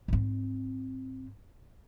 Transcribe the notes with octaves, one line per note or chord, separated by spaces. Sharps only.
G#2 C4